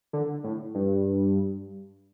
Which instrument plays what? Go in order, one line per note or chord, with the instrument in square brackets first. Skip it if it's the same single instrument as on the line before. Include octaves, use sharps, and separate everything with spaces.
[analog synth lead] D3
A2
G2